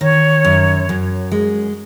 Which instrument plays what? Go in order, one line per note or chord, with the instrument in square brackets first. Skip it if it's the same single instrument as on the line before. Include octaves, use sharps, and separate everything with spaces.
[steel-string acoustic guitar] D#3 [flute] C#5
[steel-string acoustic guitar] F#2
F#2
G#3